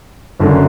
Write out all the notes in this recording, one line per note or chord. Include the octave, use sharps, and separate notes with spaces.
F#1 F#2 D3